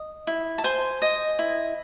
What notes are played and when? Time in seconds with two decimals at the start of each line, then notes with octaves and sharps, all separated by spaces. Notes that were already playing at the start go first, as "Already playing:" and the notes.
Already playing: D#5
0.27 E4
0.58 A5
0.64 C5 G#5 C6
1.02 D#5
1.39 E4